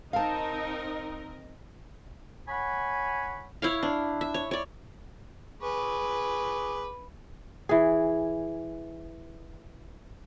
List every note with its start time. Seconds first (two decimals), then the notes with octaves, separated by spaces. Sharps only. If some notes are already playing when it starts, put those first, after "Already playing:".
0.13 C4 D#4 A#4 D#5 F5 A5
2.49 C#5 F#5 G#5 B5
3.62 E4 C#5 F5
3.83 D4
4.21 E5
4.34 C#5
4.51 C#5 D5
5.62 G#4 B4 C#6 D6
7.69 E3 G#4